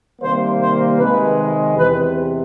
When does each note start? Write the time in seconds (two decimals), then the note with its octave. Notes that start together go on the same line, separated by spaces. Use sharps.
0.20 C3 D#3 G3 A#3 C5
0.60 C5
0.98 C3 D#3 G#3 B4
1.77 E2 C3 B4